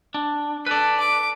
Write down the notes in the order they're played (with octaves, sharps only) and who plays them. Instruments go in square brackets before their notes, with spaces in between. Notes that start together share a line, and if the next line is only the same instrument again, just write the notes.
[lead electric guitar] D4
[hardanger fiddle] A4 [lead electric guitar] B4 D5
[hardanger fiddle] D6